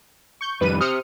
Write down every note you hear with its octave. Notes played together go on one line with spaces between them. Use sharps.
C#6 G6
F2 D#3 G3 B4 D#7
G4 C5 D#6 F6 C#7